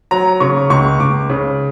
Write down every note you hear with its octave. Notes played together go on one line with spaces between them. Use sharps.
F#3 A#5
C#3 C#6
C#2 C#6
C#2 D6
C#3